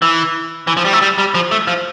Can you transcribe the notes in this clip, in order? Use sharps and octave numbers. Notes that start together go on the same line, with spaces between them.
E3
E3
F3
G3
A3
G3
G3
F3
A3
F3